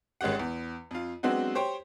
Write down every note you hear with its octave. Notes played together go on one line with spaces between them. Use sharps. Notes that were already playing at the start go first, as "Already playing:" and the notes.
G#1 G#3 C#4 G4 F#5
E2
F2 F4
F#3 G#3 B3 C4 D4 F#4
G4 C5 C#5 G5